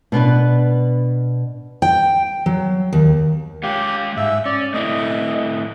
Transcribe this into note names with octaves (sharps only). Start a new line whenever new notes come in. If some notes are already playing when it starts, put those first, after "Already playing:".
B2 B3 D4 B4
G5
F#3
D#2
G#3 G4 C#5 F5
G#2 E5
C#4 D5
A3 C4 E4 D#5